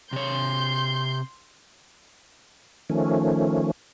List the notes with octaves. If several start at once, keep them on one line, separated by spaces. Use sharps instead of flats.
C3 C#5 C6 G6
D#3 F3 A3 C#4